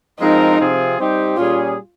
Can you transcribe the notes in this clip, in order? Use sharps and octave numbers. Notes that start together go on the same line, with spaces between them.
F3 G#3 C4 D#4 F4 A#4
C3 F3 C4 F4 G#4
G3 C4 D#4 G4
A#2 G3 C#4 F4 G#4